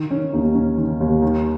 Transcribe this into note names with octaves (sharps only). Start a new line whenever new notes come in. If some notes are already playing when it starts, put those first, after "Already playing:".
Already playing: D#3
D#3 C#4
D#2 D#4
D#3 C#4
D#3
D#2
D#3